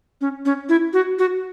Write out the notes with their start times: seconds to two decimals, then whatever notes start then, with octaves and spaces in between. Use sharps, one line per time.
0.21 C#4
0.45 C#4
0.69 E4
0.93 F#4
1.19 F#4